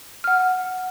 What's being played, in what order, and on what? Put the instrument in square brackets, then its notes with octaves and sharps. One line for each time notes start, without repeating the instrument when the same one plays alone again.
[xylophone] F#5 F6